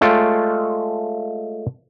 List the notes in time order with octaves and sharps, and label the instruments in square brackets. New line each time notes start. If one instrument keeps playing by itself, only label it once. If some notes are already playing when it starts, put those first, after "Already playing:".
[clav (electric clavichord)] G#3 A3 F4 C#5 G5 A5